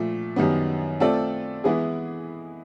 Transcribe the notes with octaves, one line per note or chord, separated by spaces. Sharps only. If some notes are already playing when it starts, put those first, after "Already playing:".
Already playing: A#2 F3 A3
F#2 D#3 G3 B3
A3 C4 F4 A4 D5
E3 G#3 B3 E4 G#4